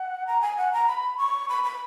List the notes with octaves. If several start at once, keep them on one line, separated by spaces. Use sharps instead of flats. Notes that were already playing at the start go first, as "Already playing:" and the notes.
Already playing: F#5
A#5
G#5
F#5
A#5
B5
C#6
B5
B5